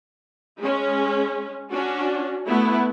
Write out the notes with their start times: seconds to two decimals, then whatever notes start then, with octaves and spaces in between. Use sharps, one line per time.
0.58 G#3 C#4
1.72 C#4 D4 F#4
2.48 A3 B3 E4